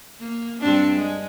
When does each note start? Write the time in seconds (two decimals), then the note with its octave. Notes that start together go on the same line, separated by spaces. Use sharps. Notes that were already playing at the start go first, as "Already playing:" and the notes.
0.20 A#3
0.60 G2 C4 D4
0.97 G#3